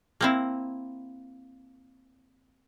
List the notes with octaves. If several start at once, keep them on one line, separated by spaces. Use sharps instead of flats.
A#3 C4 E4